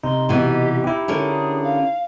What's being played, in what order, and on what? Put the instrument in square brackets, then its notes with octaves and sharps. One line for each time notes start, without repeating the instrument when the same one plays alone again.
[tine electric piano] C3 D#4 [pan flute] C6
[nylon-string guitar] B2 E3 [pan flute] G4
[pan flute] D#4 [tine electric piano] E4 G4
[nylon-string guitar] D3 C#4 A#4
[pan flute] G#4
F5